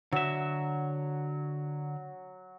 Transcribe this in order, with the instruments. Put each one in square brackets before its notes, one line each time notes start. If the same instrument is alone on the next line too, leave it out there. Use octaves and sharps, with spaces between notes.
[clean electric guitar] D3 E5 [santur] F#3